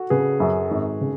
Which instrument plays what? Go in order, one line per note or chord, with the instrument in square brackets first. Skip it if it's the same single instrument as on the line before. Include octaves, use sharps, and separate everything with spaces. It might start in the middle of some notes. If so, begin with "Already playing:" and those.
Already playing: [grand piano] F#4 A4
[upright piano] C#3 [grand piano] G#4 B4
[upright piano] F#2
G#1
C#3